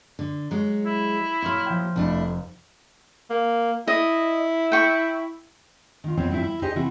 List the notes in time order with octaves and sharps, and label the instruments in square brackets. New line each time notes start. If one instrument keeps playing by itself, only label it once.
[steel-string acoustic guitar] D3
F#3 G#3
[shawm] E4
[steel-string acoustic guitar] A#2 F#3 [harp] E5 C6 F6
[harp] F3 G5
[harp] F1 [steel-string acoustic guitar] A3 D4 E4
[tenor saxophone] A#3
[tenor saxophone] E4 [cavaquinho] D#5
[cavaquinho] G5 C#6
[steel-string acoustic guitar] D#3 F4
F2 B2 F#3 C4
G2 F3 C4 E4 G4
E4
D#4 G4 G#4 C5 D#5
C3 E3 C4 E4 F#4